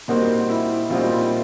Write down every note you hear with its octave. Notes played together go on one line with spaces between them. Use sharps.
A#2 G3 A#3 C4 D#4 F#4
E4
A#2 G3 C4 D#4 F4 F#4